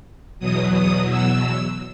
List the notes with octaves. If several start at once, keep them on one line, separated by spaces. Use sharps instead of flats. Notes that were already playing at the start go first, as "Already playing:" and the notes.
E2 B2 F#3 D#6
D#6
E6